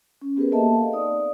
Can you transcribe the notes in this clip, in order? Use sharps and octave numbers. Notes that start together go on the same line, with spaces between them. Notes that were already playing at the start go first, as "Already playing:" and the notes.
C#4
B3 G4 G#4 A#4 B4
A#3 A4 D#5 E5 A5
F5
C4 D#4 D5 D#6